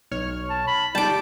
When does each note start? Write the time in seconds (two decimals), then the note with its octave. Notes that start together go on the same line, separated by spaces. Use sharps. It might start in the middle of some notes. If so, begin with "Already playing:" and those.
0.11 B1 C#5 F6
0.50 A5
0.67 B5
0.95 G3 D#4 A5 D6 G6